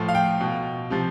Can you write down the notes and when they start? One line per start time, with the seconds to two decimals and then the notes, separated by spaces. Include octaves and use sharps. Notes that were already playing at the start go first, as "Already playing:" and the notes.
Already playing: A2 F3
0.08 F5
0.15 G5
0.40 B2
0.90 C3 F3